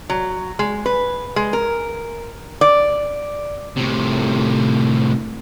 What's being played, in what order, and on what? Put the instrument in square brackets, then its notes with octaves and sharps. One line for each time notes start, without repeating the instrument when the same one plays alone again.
[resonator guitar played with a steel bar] F#3
G#3
B4
G#3
A#4
D5
[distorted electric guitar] A2 C3